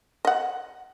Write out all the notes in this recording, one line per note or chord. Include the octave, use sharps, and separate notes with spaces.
D#5 F#5